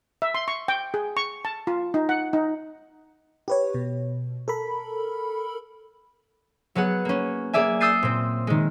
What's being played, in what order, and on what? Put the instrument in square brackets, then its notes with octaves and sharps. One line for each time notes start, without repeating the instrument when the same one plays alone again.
[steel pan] E5
C6
C#6
G5
G#4
C#6
A5
F4
D#4
F#5
D#4
[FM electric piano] G4 B4 C#5
B2
A4 A#4 B5
[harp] F#3 B3 G#4 F#5
A#3 C#4
A#3 G#4 D5 E5 G#5
D#6 E6 G6 A6 C7 D#7
A#2 C4
D#3 G#3